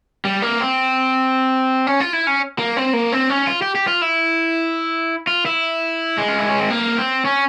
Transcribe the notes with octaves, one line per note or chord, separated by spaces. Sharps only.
G3
A#3
C4
C#4
F4
E4
C#4
A#3
C4
A#3
C4
C#4
F4
G4
G4
F4
E4
F4
E4
G#3
F4
E4
C#4
C4
A#3
C4
C#4